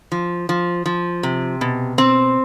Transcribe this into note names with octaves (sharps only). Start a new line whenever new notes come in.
F3
F3
F3
C3
B2
C4